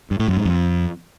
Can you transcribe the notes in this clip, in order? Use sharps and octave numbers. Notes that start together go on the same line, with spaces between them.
G2
A2
F#2
G#2
F2